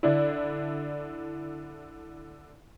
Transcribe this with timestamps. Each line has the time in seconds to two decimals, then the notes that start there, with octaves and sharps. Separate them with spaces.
0.03 D3 D4 E4